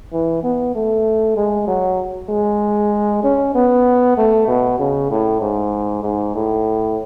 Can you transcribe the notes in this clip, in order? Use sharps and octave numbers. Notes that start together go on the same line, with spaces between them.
E3
B3
A3
G#3
F#3
G#3
C#4
B3
A3
B2
C#3
A2
G#2
G#2
A2